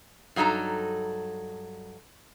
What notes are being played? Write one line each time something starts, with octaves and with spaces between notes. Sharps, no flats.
G2 F#3 D#4 A4 A#5